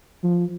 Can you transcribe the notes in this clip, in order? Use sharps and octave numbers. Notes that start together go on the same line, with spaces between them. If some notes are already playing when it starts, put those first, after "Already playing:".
F3